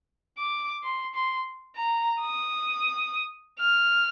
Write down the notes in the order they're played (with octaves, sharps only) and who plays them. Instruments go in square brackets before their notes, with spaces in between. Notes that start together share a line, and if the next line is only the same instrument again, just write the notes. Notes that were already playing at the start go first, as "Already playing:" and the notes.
[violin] D6
C6
C6
A#5
D#6
F6